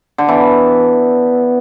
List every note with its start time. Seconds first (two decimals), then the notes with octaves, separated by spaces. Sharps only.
0.18 D3
0.29 E3 B3